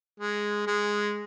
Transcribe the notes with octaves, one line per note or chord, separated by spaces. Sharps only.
G#3
G#3